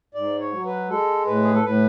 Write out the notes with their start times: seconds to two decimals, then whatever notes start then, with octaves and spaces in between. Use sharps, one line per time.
0.14 G#2 D5
0.40 C#5
0.53 F#3
0.65 B4
0.89 G#3 A4
1.27 A2 B4
1.43 G#4
1.54 A4
1.64 A2 B4